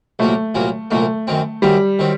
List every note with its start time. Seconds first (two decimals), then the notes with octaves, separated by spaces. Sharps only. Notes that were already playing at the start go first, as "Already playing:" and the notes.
0.19 C2 A#2 F#3 A3 A#3
0.55 C2 A#2 F#3 A#3
0.91 C2 A#2 F#3 A3 A#3
1.27 F#2 D#3 F#3 C4
1.62 F#2 D#3 F#3 G3 C4
1.99 D#3 F#3 C4